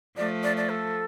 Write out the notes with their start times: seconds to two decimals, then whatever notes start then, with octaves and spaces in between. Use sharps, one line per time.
0.17 F3 A3 D5
0.43 D5
0.57 D5
0.69 A4